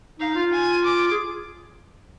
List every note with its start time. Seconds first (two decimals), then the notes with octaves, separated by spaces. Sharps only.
0.20 D#4 F5
0.35 F4
0.52 G#5
0.84 D6
1.11 G#4